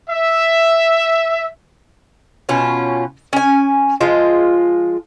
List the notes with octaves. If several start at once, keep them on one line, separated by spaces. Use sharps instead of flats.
E5
B2 C#4 F4
C#4 G#5
F3 G#3 F4